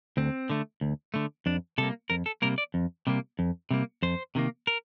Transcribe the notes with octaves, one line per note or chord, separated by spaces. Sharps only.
D2 C4
D3 A3
D2
D3 A3
F2 D4
C3 G3 A#3 A4
F2 A#4
A4
C3 G3 A#3 A#4
D5
F2
C3 G3 A#3
F2
C3 G3 A#3
F2 C5
C3 D#3 G3 A#3
A#4